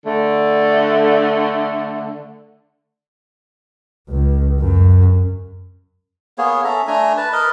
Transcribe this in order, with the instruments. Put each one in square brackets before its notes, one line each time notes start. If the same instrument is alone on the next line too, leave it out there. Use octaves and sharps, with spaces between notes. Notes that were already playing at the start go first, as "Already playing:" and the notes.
[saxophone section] D3 A3
[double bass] C#2
F#2
[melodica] A#3 B3 G#4 C#5
C#4 A4 E5 A#5
A3 D4 G#5 A#5
B4 A5
A#4 B4 D#5